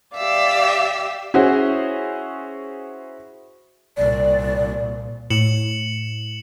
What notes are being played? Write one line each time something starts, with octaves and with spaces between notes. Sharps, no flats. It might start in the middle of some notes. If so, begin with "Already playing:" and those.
G4 D5 E5 F5
C#4 E4 F#4 G#4 C5
C2 A#2 D5
A2 C#7 E7 F#7